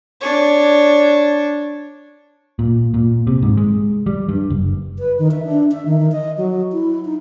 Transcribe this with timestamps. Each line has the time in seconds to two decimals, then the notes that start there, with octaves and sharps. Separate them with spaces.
0.21 D4 C#5
2.59 A#2
2.94 A#2
3.27 C3
3.42 G#2
3.57 G#3
4.06 G3
4.29 G2
4.50 F#1
4.99 B4
5.19 D#3
5.31 E5
5.45 D4
5.71 E5
5.86 D#3
5.99 D#3
6.12 D#5
6.37 F#3
6.72 E4
7.05 D#4